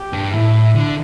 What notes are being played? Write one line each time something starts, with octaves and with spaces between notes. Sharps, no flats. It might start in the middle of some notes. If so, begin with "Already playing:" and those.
Already playing: G4
G2
A2 E4
D3